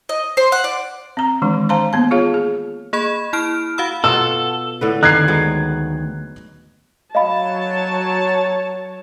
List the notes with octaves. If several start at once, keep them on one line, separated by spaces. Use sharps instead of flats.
D#5
C5
F#5
D5
C4 A#5
D#3 E3 G#3 D4
C5 F5 A5 A#5 C6
A#3 B3 A5
F4 G#4 C#5 F5
G#4
A#3 G#4 B5 G#6
E4 F6 D7
F#4 F5 F#5 B5 E6
B2 F4 F#4 A4 E6
A2 D3 B4
D2 D#3 F#6 G#6 C7
F#3 G#3 B3
F#3 C#5 D#5 F5 A5 B5